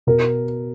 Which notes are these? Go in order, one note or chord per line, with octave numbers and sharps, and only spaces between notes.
B2 A#4